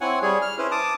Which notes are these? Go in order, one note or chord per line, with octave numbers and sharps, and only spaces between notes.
C4 E4 C#5 F#5 G#5
G3 G#4 C#5
F6
C#4 E4 B4 C5
A5 D6 D#6